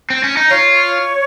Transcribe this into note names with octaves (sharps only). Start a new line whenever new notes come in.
C4
C#4
D#4
F4 C#5